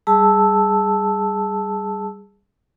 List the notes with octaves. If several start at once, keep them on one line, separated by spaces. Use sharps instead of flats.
G3 G#4 A5 E6